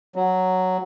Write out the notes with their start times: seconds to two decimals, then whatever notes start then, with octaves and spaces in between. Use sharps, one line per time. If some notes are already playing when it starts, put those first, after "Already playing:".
0.16 F#3